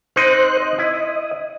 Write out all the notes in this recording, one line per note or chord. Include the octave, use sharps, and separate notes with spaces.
C4 D#4 C5 F#6
D#5
E4